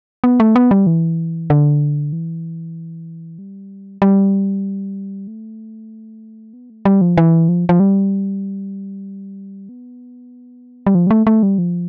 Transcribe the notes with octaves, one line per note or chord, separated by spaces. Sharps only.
B3
A3
B3
G3
E3
D3
E3
G3
G3
A3
B3
A3
G3
F3
E3
F3
F3
G3
B3
G3
F3
G3
A3
A3
G3
F3